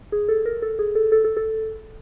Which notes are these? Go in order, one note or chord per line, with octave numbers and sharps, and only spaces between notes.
G#4
A4
A#4
A4
G#4
A4
A4
A4
A4